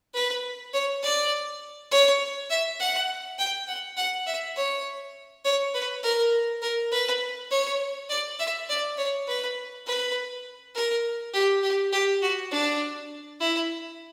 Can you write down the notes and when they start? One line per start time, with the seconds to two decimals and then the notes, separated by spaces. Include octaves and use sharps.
0.14 B4
0.74 C#5
1.03 D5
1.91 C#5
2.50 E5
2.80 F#5
3.39 G5
3.68 F#5
3.97 F#5
4.27 E5
4.56 C#5
5.45 C#5
5.74 B4
6.03 A#4
6.62 A#4
6.92 B4
7.51 C#5
8.10 D5
8.39 E5
8.69 D5
8.98 C#5
9.27 B4
9.86 B4
10.75 A#4
11.34 G4
11.63 G4
11.92 G4
12.22 F#4
12.51 D4
13.40 E4